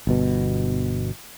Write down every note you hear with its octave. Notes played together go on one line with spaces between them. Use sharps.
G1 B2